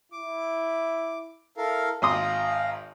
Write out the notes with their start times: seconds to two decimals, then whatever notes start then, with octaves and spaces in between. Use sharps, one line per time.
0.12 E4 D6
1.57 E4 A4 A#4 F5
2.02 G#1 F5 A#5 C6 D#6